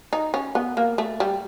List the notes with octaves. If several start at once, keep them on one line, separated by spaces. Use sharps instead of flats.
D#4
C#4
B3
A#3
A3
G3